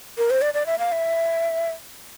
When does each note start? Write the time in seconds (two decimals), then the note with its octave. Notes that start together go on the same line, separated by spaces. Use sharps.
0.18 A#4
0.30 C5
0.42 D5
0.54 D5
0.66 E5
0.79 F5
0.92 E5